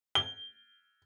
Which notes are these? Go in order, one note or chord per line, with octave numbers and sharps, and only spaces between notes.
G7